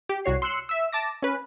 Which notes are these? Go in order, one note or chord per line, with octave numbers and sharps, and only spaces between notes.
G4
C2 F#4 C#5 C7
C6 E6 F#6 C#7
E5 E6
A5 D6 A#6
C#4 B4